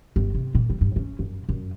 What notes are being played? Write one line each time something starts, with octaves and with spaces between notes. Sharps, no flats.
G1
C3
A#2
G3
G2
C#4
F#2
F#2